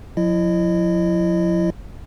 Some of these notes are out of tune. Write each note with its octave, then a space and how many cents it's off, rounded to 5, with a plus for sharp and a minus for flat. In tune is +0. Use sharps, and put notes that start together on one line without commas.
F3 +45 E4 +20 D#5 -30